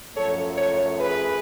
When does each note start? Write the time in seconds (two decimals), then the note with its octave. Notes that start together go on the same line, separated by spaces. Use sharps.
0.16 F#2 F3 A3 A4 C#5
0.57 A4 C#5
0.97 G#4 B4